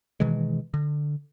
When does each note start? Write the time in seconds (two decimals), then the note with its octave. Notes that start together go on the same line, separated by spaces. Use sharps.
0.20 B2 D#3 E3 G#3
0.74 D3